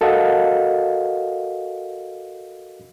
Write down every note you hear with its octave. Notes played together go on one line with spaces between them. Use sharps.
F#4 A4 A#4 D#5 F5 F#5